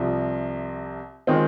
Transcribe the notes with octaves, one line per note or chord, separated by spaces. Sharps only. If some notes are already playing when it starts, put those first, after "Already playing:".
Already playing: C2 C3 F3
D#3 G#3 C4 F4